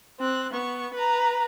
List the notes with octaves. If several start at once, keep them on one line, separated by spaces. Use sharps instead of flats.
C4 F#6
B3 C#6
B4 A#5